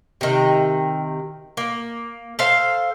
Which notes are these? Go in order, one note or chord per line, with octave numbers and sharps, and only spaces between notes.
C3 D#3
A#3
A4 C5 F5